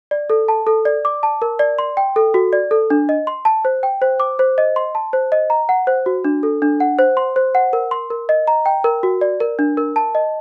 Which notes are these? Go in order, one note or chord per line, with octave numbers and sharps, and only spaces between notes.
D5
A4
A5
A4
D5
D6
A5
A#4
D5
C6
G5
A4
F#4
D5
A4
D4
D#5
C6
A5
C5
G5
C5
D6
C5
D#5
C6
A5
C5
D#5
A#5
F#5
C5
F#4
D4
A4
D4
F#5
C5
C6
C5
F#5
A#4
C6
A#4
D#5
A#5
G5
A#4
F#4
D5
A#4
D4
A#4
A5
D#5